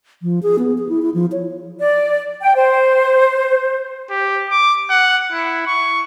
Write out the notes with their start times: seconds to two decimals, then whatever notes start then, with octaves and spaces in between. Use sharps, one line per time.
0.23 F3
0.43 G#4
0.59 B3
0.78 G#4
0.89 E4
1.02 E4
1.14 F3
1.32 C#5
1.80 D5
2.41 G5
2.55 C5
4.10 G4
4.50 D6
4.90 F#5
5.32 E4
5.67 C#6